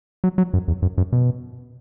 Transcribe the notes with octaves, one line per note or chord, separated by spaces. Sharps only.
F#3
F#3
F#2
E2
F#2
F#2
B2